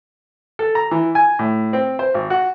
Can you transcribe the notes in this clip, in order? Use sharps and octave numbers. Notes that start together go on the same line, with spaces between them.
A4
A#5
E3
G#5
A2
C4
C5
G#1
F#4